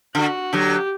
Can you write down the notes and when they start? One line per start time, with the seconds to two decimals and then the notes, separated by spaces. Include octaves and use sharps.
0.15 D3 F#4
0.53 D3 F#3 G4